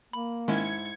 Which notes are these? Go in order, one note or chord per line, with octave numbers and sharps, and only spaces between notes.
A#3 B5
G#2 D#3 G#3 C#4 E4 G#6 C#7